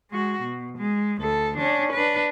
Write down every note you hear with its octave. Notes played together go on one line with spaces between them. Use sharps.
G#3 F#4
B2
G#3
D2 A4
C#4 D4
D4 B4